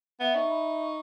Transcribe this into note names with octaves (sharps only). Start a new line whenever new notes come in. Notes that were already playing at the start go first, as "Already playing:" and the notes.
B3 E5
D#4 C#6
B5
C#6